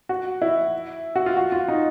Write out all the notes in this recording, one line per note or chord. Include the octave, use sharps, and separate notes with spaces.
F#4
E4
F#4
F4
F#4
F4
D#4